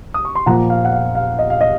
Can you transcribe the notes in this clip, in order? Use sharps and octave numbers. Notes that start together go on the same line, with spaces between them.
D#6
C#6
C6
A#2 F3 A#3 F#5 A#5
F5
F#5
F5
F5
D#5
F5
D#5